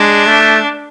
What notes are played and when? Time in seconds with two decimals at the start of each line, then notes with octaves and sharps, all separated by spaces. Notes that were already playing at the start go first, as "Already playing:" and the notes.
Already playing: G#3 D4
0.27 A3